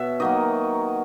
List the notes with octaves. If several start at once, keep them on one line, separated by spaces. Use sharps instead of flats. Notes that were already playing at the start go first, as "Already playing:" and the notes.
Already playing: B2 C#5 E5
D#3 F#3 A#3 D#5